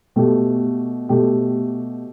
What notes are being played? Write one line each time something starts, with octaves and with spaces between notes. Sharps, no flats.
B2 A3 G4
B2 A3 G4